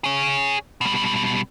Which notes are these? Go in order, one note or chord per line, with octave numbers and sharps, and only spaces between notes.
G#4 C#5
B2 G3